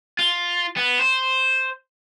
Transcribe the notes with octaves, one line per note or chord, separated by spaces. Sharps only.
F4
B3
C5